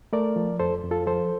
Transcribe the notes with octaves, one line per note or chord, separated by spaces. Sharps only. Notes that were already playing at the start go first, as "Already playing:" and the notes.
A3 A#4 D5
F3
F2 A4 C5
F2
F4 A4
F3 A4 C5